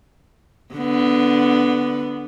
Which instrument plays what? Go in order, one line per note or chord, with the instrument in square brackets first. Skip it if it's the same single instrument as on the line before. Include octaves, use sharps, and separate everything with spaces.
[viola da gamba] D3 B3